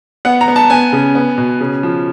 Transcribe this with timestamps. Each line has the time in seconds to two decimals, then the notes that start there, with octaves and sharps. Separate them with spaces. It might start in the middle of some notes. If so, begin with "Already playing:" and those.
0.25 B3 F#5
0.41 A#5
0.48 B3
0.56 A5
0.70 B3 G#5
0.93 C#3
1.15 B3
1.38 B2
1.60 C#3
1.83 F3